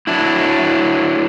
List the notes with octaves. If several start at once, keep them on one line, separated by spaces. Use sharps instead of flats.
F#3 D4 E4